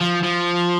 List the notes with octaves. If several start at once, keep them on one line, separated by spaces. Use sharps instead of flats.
F3
F3